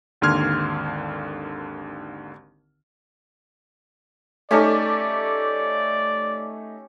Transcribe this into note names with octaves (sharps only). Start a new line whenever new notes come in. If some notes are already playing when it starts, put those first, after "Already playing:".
G#1 D#2 D3 C6 F6 G#6
A3 C#4 D#4 G4 A4 D5